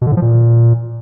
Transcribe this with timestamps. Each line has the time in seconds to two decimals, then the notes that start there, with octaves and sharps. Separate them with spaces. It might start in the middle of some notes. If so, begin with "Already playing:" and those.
0.01 B2
0.07 D3
0.12 A2
0.17 F3
0.22 A#2